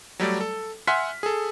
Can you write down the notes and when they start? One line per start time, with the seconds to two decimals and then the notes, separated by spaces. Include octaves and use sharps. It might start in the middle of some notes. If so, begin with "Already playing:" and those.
0.19 F#3 G3 A3 D5
0.40 A4
0.87 E5 F#5 G#5 C6 F6 B6
1.23 G#4 A4